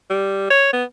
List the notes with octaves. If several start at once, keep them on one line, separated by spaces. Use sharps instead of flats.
G3
C#5
B3